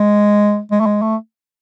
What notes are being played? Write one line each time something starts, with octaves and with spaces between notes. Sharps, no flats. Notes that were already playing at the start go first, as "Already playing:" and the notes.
Already playing: G#3
G#3
A3
G#3
A3